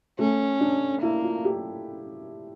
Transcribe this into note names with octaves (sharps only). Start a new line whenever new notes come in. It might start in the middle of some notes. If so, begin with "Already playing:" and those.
A3 C#4
D4
A#3 E4
F4
G4